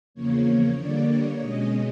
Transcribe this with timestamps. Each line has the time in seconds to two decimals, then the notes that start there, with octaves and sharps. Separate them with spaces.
0.14 E2 C#3 F3 A#3 C#5
0.77 D3 G3 A#3 D5
1.08 C#5
1.40 B2 G#3 C#4 D#5